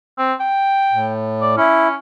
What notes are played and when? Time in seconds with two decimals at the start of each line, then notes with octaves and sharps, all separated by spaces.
0.18 C4
0.40 G5
0.92 A2
1.41 D5
1.57 C#4 E4